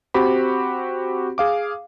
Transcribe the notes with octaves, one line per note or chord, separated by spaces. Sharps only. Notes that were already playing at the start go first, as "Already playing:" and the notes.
C4 F#4 G4 C5 B5
G#4 F5 D6